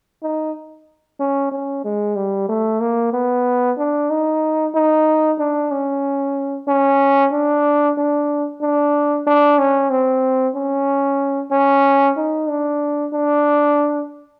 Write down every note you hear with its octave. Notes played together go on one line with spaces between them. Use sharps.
D#4
C#4
C#4
G#3
G3
A3
A#3
B3
D4
D#4
D#4
D4
C#4
C#4
D4
D4
D4
D4
C#4
C4
C#4
C#4
D#4
D4
D4